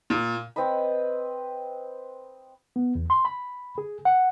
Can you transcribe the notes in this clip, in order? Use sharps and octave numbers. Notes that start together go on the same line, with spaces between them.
A#2
C4 B4 D#5 B5
B3
E2
C6
B5
G#4
F#5